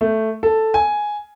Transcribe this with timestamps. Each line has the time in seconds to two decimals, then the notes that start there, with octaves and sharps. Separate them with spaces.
0.01 A3
0.43 A4
0.74 G#5